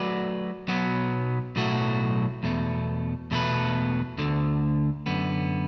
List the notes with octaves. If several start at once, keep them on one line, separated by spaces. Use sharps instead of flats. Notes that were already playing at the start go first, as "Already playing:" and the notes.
Already playing: F#3 A3 F#4 B4 D5
B1 B2 F#3 B3
B1 A2 F#3 A3 F#4
E2 B2 A3
E2 B2 A3 F#4 B4
D2 D3 A3
F#2 D3 B3